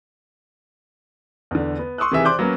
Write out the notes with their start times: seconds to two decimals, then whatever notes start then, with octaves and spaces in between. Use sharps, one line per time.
1.51 E2 D3
1.79 B3
1.98 C6 C#6 D#6 E6 F#6
2.11 C3 D#3 E3 G#4 E5
2.25 C5 D5 C6 D6 F#6 G6
2.39 F#3 A#3 B3 C#4